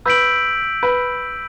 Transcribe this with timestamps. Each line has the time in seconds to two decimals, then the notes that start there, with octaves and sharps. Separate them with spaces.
0.06 B4 E6 G6 B6 D7 F#7
0.83 B4